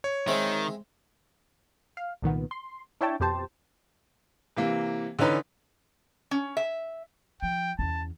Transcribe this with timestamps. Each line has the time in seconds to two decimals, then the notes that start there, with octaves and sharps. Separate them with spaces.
0.04 C#5
0.28 D#3 G#3 C4 E5
1.97 F5
2.22 C2 A#2 D#3 B3
2.51 C6
3.01 D4 E4 C#5 E5 G5 A5
3.20 F2 B2 G4 C5 A5
4.57 C3 E3 A#3
5.19 D3 E3 C#4 D#4 B4
6.31 C#4
6.57 E5
7.42 F3 G5
7.79 E2 C#4 A5